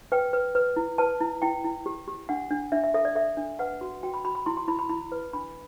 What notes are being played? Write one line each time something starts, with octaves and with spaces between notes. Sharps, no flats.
B4 G5
B4
B4
E4
B4 A5
E4
E4 G5
E4
G4
G4
D4 F#5
D4
D4 E5
E5
A4 E5
D5
A4 E5
D4
B4 F#5
F#4
F#4 G5
B5
F#4 B5
B5
E4 C6
C6
E4 B5
B5
E4 B5
B4
D4 B5